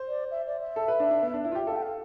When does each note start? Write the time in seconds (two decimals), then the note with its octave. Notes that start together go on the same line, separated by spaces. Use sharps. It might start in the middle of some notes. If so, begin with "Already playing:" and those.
Already playing: C5
0.08 D5
0.31 E5
0.47 D5
0.61 E5
0.76 A4
0.88 B4
1.00 D4
1.11 D4
1.22 B3
1.33 D4
1.44 E4
1.52 F4
1.55 G4
1.67 A4 F5
1.76 G5
1.82 F5